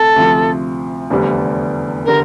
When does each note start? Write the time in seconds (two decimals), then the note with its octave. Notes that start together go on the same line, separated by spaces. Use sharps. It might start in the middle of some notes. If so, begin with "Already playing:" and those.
Already playing: D2 C3 A4
0.16 D2 C3 F3
1.10 F1 E2 D3 G3 D4
2.05 D3 G3 A#4